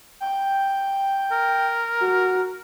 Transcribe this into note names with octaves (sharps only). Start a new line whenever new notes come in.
G5
A#4
F#4